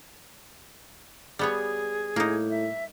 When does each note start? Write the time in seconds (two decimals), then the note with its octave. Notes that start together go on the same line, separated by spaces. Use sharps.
1.39 G3 B3 G#4 C#5
2.16 A2 A#3 D#4
2.50 E5